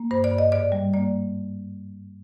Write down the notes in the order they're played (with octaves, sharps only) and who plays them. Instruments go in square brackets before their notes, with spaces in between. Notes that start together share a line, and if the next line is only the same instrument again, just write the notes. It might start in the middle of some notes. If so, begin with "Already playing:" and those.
Already playing: [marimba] A#3
G2 C5
D5
G2
D#5
G#2 D5
G3
A#3 D5